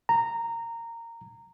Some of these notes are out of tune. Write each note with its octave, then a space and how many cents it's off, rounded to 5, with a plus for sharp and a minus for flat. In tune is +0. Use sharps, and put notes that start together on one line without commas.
A#5 -15